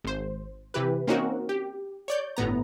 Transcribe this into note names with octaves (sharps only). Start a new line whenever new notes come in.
G#1 C5
C3 E3 G4 B4
A#3 C4 C#4 D#4 F#4 A#4
G4
C#5 D5 G6
G1 A2 B3 A#5